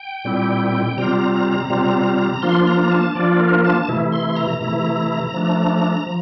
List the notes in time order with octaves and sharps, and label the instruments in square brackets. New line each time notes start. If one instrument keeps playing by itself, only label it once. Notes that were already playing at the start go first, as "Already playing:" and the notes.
Already playing: [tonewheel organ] G5
A#2 G3 C4 E4
C3 G3 C4 F4 A#5
C3 G3 C4 F4
F3 A#3 D4 F4 C6
A#5
A5
F3 A#3 D4 F4 D5
A#4
A5
C3 E3 A3 E4
C6
A#5
C3 E3 A3 E4 A#5
F3 A3 D4
F3